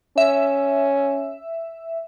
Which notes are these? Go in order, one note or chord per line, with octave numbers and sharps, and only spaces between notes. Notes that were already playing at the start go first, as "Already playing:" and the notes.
C#4 E5